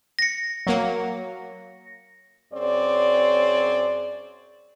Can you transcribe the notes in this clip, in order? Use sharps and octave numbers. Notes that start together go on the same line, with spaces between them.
A#6 C#7
F#3 A#3
F#2 C4 G#4 C#5 D5